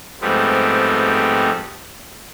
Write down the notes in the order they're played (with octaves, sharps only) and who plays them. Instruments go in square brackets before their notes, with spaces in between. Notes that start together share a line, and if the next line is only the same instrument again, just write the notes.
[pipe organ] G#2 F3 G3 A3 B3 C4